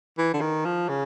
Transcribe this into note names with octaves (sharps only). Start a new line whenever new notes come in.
E3
D3
D#3
F3
C#3